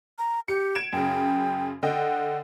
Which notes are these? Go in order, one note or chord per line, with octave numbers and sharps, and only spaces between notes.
A#5
G4 C#7
G#6 D7 E7
F#2 C#3 G5
D3 D#5 F#5 G5